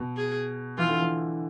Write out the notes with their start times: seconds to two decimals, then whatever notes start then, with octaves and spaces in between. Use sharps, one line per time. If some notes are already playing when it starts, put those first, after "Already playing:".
Already playing: B2
0.17 G#4
0.78 E3 F4
0.89 D3
1.00 E3